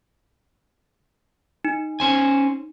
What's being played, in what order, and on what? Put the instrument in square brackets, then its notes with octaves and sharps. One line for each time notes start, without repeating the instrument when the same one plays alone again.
[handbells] D#4
[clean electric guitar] C#4 C5 G#5